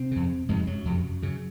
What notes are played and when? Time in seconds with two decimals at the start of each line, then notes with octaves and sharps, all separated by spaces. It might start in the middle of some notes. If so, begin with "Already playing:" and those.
Already playing: C3 C4
0.11 F2 C#3
0.49 F2 G#2 C3 G#3
0.67 F#2 F#3
0.85 F2 C3
1.22 F#2 C#3